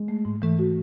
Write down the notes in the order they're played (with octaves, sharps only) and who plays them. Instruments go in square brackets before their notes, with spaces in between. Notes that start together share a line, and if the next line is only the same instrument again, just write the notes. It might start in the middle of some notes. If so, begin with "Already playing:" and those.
Already playing: [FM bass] G#3
[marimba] A3
G#2
[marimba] E3 [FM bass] A3
[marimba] F#4